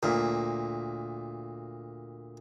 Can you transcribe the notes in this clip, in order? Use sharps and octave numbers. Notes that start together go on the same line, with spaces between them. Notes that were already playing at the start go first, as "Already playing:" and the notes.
D2 A#2